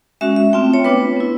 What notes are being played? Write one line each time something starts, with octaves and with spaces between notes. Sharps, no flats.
G#3 C#4 F#4 E5
E5
A3 C4 F4 G5
C#5
B3 D4 F4 B4
B3 E4